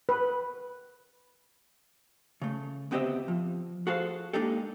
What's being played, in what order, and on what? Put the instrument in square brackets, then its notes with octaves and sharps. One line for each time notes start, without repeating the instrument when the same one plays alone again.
[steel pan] B4
[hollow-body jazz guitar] C#3 A3
D2 B3 C4 G4 D#5 E5
F3
F#4 G#4 A4 C5 F5
G#3 A#3 D4 D#4 G4 A4